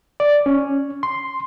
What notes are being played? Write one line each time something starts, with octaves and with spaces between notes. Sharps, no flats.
D5
C#4
C6